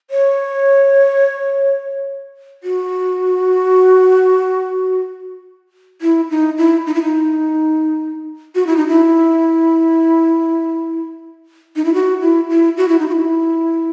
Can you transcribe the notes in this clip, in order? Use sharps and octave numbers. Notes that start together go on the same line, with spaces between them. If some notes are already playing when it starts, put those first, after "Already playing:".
C#5
F#4
E4
D#4
E4
D#4
E4
D#4
F#4
E4
D#4
E4
D#4
E4
F#4
E4
E4
F#4
E4
D#4
F#4
E4